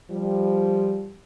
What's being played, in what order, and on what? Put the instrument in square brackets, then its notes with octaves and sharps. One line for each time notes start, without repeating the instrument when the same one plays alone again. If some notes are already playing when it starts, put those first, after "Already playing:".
[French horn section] F3 G3